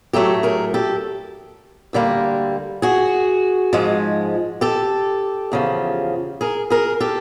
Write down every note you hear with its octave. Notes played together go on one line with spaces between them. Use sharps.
A2 F#3 A3 G4 A4
G#4 A#4
G4 A4
D2 D3 G3 A#3
F#4 G#4
G#2 F3 G#3
G4 A4
E2 C#3 F3
G#4 A#4
G#4 A#4
G4 A4